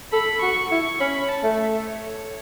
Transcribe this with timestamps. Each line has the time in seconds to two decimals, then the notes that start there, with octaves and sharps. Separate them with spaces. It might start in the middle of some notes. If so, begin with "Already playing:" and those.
0.13 A4 B5
0.42 F#4 C#6
0.71 E4 C#6
1.00 C#4 B5
1.29 A5
1.44 A3
1.59 E5
1.87 C#5